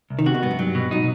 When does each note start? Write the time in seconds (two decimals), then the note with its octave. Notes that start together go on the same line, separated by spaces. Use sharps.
0.10 C2
0.19 D#3
0.26 C3 F#4
0.35 B2
0.42 G2 B3
0.51 F#2
0.59 G2 F#3
0.75 B2
0.91 F#3 D#4